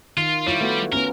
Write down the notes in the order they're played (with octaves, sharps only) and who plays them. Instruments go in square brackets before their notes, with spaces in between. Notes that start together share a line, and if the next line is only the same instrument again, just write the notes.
[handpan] D#3 [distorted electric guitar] F4
[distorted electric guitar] G3 [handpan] E4 F4 C#5
[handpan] A3 B3 F#4
[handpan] B3 C#4 [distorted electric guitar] A#4